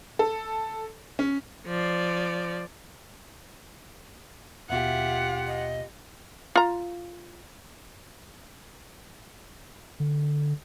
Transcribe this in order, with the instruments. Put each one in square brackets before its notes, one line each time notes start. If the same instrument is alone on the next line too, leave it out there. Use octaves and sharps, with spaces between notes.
[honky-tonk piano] A4
C#4
[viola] F3 D5
[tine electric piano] D#2 B2 [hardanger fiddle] F4 G4 [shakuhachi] E5 [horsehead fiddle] F#5
[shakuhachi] D#5
[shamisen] F4 A#5
[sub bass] D3